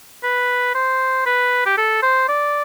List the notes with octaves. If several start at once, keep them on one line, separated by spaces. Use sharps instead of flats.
B4
C5
B4
G4
A4
C5
D5